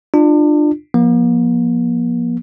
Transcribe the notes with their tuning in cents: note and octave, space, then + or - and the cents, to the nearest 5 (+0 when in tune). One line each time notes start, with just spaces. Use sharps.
D4 +30 F4 +0
F3 +5 A#3 +40